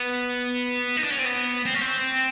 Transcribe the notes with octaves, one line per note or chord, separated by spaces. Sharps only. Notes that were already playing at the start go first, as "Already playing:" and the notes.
Already playing: B3
D#4
D4
C#4
C4
B3
C4
C#4
C4